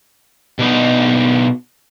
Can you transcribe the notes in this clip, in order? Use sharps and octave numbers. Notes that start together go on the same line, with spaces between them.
B2 D4 D#4